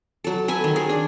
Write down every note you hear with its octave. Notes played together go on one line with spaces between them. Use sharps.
F#3 A4
A4 B4 G#5
D#3
G#4
D4